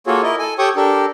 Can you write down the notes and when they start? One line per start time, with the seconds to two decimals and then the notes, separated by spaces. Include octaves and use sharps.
0.07 A#3 F4 F#4 G#4 A4 C#5
0.23 E4 A#4 D#5
0.39 A4 G#5
0.58 G4 A4 C#5 G5 C#6 D#6
0.76 D4 G4 A4 A#4